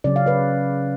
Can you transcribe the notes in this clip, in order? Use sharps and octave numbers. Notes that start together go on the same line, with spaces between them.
C#3 F#3 C#4 D5
F5
B4 D5